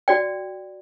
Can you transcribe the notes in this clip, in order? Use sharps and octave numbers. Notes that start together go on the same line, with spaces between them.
F#4 D5 G5